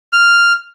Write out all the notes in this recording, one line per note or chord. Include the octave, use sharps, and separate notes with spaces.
F6